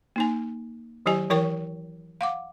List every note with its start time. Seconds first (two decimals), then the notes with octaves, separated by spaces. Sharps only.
0.16 A#3 D#4 G#5
1.06 D#3 F#3 E4 G4 D#5 G#5
1.30 E3 E4 A#4 C#5 G5 C#6
2.21 F5 F#5 D6